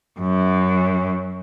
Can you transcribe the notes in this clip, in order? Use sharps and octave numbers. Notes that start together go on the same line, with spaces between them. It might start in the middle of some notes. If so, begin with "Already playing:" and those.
F#2